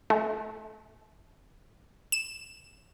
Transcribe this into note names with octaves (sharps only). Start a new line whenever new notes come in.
A3
E7